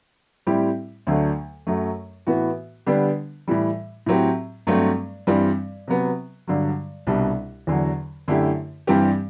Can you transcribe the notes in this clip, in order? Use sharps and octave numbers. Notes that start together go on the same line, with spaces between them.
A2 G3 C4 E4 G4
D2 D3 F#3 A3
F#2 F#3 A3
A2 E3 B3 F#4
D3 G3 B3 D4 G4
A2 E3 G3
A2 F#3 C4 G4
G2 F#3 A3 C4
G2 E3 G3 C4
C3 F#3 B3
G2 D3 F#3
C2 B2 G3 D4
E2 D3 F#3
F#2 D3 A3 E4 G4
G2 E3 G3 C4 G4